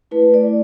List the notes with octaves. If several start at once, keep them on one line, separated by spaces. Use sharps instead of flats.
A3 E4 B4
D5